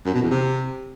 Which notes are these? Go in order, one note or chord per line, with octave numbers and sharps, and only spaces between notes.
F#2
B2
E2
C3